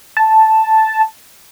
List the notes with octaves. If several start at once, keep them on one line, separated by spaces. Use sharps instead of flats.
A5